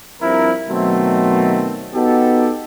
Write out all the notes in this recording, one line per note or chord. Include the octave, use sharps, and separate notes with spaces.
G2 F3 C4 E4 A#4
B2 D#3 F#3 A3 C4
B3 D#4 F#4 G4 A4